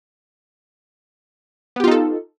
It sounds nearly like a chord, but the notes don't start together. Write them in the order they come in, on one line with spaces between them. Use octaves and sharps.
B3 G4 F4 D#4 A4